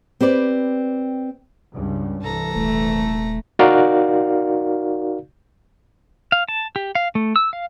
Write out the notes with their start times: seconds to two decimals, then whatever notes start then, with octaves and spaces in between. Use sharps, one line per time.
0.21 C4 G4 B4 D5
1.73 C#2 G2 C#3
2.22 C2 E3 A4 A#5
2.55 D#1 A3
3.59 D#4 F#4 A#4 D5 F5
6.32 F5
6.48 A5
6.76 G4
6.95 F5
7.15 A3
7.36 E6
7.53 F5